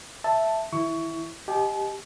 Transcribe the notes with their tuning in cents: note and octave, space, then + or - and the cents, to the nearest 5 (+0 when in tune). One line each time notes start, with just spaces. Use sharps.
E5 +0 A5 +0
E3 -45 E4 +0 C#6 +20
G4 +10 D#5 +0 A5 -45